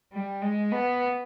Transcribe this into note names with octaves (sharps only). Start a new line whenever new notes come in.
G3
G#3
B3